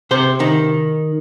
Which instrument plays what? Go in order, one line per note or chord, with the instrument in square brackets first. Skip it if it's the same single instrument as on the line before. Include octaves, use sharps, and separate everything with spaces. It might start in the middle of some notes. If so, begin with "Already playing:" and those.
[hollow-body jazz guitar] C3 C5
D#3